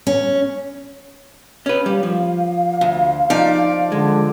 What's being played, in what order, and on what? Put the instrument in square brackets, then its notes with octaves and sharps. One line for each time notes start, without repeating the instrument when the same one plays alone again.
[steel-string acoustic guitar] C#4
[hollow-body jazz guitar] C#4 B4
[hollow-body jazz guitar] G3 [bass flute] F5
[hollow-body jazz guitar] F3
[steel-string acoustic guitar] D2
[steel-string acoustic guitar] F3 D5 [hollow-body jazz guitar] D#4
[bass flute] D3 [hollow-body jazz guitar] G#3